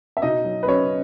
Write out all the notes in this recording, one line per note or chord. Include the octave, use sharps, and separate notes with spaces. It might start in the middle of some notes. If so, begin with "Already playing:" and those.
E5
B2 D#4 D#5
F#3
B4
F#3 C#4 C#5